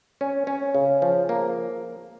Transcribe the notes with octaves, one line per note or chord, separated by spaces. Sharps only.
C#4
C#4
C#3
F3
A#3